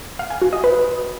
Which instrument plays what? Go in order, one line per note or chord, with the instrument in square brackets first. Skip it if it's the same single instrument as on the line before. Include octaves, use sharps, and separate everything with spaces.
[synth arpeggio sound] F5
G#5
F#4
D#5
B4